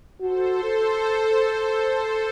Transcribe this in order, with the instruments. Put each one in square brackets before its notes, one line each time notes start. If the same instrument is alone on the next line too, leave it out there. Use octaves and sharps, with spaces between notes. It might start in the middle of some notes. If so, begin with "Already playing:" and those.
[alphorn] F#4 [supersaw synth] A4 C5
[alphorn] A4